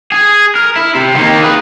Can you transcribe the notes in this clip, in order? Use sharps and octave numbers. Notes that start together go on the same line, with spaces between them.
G#4
A#4
E4
C3
D#3 A#3
G#4 B4